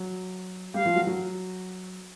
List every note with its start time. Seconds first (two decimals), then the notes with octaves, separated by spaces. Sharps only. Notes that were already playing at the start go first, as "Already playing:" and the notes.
Already playing: F#3 F#4
0.74 G3 G4 F5
0.86 F3 F4
0.96 F#3 F#4
1.07 F#3 F#4